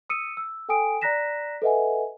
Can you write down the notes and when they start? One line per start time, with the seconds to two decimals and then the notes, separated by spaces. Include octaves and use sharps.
0.10 D#6 E6 C#7 D#7
0.37 E6
0.69 A4 G5 G#5 D#6 D7
1.02 D5 A#5 F#6 A#6 B6 E7
1.62 A4 B4 D#5 E5 F#5 G#5